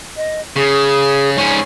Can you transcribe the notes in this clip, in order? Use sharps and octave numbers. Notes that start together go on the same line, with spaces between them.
D#5
C#3 G#4
G#2 C#4 C#5